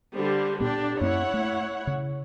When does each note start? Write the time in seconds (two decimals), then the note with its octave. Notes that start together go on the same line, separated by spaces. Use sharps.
0.14 D3 G3 C5
0.60 A#2 B3 D4 G4
1.01 F#2 A#3 C#4 E4 C#5 F#5
1.34 A3
1.87 C#3